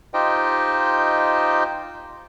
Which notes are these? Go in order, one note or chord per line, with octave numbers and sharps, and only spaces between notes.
D#4 F4 G4 C5 D#5 G5